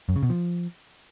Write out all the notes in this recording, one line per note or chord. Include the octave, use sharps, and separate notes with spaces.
F#2
C#3
B2
F3